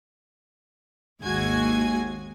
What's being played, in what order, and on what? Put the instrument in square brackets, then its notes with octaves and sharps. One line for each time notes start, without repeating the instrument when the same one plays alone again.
[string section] G#1 D#2 G#3 F#4 G#5 G#6